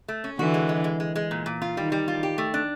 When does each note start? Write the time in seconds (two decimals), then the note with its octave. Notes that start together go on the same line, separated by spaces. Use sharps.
0.08 A3
0.24 C#4
0.39 D3 E3 F#4
0.54 G#3
0.69 G#3
0.84 G#3
1.00 G#3
1.16 G#3
1.31 A#2
1.46 A#2
1.62 F4
1.76 D#3 G3
1.92 G3
2.08 F4
2.23 G4
2.38 A3
2.54 D4